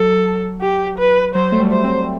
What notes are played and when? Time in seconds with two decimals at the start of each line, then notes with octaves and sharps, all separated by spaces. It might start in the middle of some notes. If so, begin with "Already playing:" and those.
Already playing: F#3 A4
0.61 G4
0.98 B4
1.34 F#3 C5
1.52 A3
1.59 G3
1.72 C5
1.84 C4